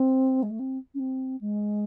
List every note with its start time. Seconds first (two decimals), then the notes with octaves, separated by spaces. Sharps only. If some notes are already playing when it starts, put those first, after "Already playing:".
Already playing: C4
0.42 G#3
0.50 A3
0.59 C4
0.94 C#4
0.99 C4
1.41 G#3